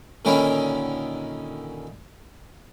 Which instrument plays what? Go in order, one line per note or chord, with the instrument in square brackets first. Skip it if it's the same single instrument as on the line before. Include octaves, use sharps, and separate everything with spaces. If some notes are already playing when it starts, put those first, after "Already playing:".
[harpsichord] A#2 D3 D#3 C#4 E4